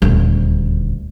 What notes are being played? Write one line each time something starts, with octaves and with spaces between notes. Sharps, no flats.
D#1 D2